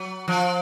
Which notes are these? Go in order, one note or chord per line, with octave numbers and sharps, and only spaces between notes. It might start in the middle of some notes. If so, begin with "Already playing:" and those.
Already playing: F#3
F3